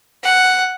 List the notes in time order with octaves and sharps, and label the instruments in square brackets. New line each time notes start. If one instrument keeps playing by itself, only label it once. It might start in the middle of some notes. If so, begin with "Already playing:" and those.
[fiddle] F#5